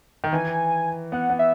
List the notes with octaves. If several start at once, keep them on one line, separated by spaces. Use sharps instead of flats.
D#3
E3 G#5
B3 F#5
B3
E5